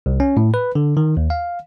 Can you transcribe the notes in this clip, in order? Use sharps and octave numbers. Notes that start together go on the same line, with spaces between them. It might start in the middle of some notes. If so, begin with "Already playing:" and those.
C2
C#4
A2
B4
D3
D#3
D#2
F5